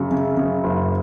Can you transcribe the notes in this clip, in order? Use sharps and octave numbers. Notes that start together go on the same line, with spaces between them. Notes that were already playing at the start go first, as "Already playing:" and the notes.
Already playing: F#2 C#3
C#3
C#3
F#1